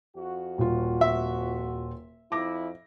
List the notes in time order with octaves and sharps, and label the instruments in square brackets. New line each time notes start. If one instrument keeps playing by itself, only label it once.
[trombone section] F2 F#4
[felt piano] D#1 F4
[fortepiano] E5
[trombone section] F2 E4 [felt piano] D6 A#6